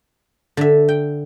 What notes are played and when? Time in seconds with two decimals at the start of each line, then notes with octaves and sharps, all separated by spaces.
0.57 D3 E5
0.89 G5